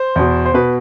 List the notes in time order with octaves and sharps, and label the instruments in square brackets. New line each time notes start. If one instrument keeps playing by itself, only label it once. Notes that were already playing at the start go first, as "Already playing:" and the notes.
Already playing: [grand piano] C5
E2 B2
C5
B2 B4